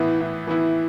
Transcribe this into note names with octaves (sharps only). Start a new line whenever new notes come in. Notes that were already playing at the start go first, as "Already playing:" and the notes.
Already playing: A2 E3 B3 E4
A2
E3 B3 E4